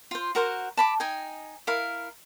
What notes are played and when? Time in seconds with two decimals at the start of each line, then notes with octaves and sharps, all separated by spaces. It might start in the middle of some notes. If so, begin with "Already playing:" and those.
0.11 F4 C5
0.35 F#4 A#4 C5 F#5
0.77 A5 B5 D6
1.00 D#4 D#5 G5 G#5
1.67 E4 A#4 F5